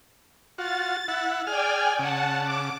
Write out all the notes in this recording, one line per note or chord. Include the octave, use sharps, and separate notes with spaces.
F4 F#4 A6
E4 F#5
G#4 D5 G5 G#5 F6
C#3 F#5 A5
D6